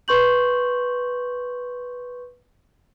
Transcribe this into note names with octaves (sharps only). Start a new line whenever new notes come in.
B4 C6 C#6 G6 F#7